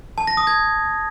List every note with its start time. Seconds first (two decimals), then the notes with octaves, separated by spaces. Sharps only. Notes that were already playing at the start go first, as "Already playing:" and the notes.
0.18 A5
0.27 A#6
0.37 D#6
0.47 G#6